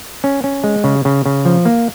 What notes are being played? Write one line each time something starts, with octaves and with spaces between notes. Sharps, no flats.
C#4
C#4
G#3
C#3
C#3
C#3
F3
A#3